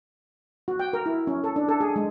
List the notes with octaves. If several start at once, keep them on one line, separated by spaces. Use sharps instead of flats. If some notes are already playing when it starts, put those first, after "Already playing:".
F#4
G5
A#4
E4
C#4
A4
D4
A4
G#4
G#3